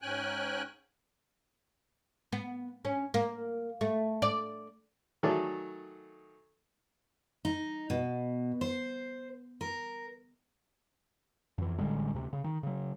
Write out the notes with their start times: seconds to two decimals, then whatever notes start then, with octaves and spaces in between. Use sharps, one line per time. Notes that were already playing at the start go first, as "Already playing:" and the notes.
0.02 G#2 C#4 G5 G#5 F#6
2.32 B3
2.85 C#4
3.14 A#3
3.81 A3
4.22 D5
5.23 D#3 F#3 A3 G#4 A4 D5
7.45 D#4
7.90 B2
8.61 C5
9.61 A#4
11.58 F2 E3
11.78 A1 D3 G3 G#3
12.14 D2 C3
12.33 C#3
12.44 D#3
12.63 C#3 F#3